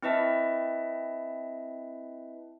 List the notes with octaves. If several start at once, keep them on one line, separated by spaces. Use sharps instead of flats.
C4 E4 B4 D#5 E5 A5